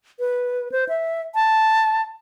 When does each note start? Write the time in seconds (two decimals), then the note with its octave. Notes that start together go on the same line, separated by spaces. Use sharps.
0.19 B4
0.72 C5
0.89 E5
1.35 A5